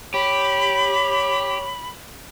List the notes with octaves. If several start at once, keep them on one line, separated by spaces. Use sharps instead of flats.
G4 C#5 B5